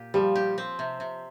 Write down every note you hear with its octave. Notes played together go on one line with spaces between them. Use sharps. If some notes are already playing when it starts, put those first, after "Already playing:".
Already playing: A#2 G4
F3 G3
G4
C4
C3
C3